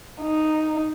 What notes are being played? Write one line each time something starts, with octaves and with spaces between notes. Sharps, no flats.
D#4